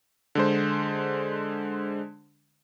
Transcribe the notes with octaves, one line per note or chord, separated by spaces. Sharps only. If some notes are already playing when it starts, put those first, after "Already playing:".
D3 G#3 C5